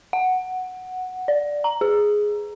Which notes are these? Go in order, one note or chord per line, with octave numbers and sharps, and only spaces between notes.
F#5
D5
A#5
G#4